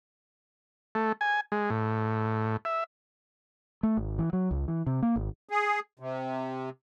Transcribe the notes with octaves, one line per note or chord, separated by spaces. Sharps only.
A3
G#5
G#3
A2
E5
A3
G#1
E3
F#3
C#2
E3
C3
A#3
G#1
G#4
C3